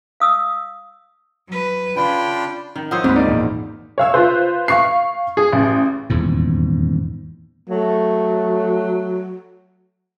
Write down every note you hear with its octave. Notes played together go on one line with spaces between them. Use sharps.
F5 D#6 E6
F#3 B4
C#3 D4 F4 G5 B5
D#3
F3 C5 C#5 F#5 D#6 E6
D2 G#2 G#3 A#3 C4 B4
D#4 A#4 D5
G#1 E2 A#2
C#5 F5 E6
F4 B4 C5
F5 C#6 C7
G#4
A1
D#1 E2 G#2
F#3 A3